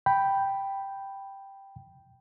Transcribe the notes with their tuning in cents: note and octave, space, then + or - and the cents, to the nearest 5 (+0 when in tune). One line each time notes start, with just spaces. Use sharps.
G5 +0 B5 +0